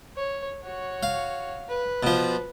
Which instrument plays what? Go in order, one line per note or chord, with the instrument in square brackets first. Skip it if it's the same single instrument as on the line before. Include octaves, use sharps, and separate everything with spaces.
[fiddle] C#5
F#4 C#5
[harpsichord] F5
[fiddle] B4
[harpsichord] B2 F3